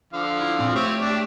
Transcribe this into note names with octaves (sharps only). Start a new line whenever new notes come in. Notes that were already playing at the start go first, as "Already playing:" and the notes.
D3 F3 F5
E4
A#2 C4
A3 C4 G4 C#5 G5
D4